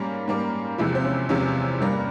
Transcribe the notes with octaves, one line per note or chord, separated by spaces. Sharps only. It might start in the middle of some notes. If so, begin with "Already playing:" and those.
Already playing: G#2 G3 A#3 C#4
G#2 G3 A#3
E2 C3 F3 G#3 E4
C4
C#4
E2 C3 F3 G#3 C#4
G2 G3 A#3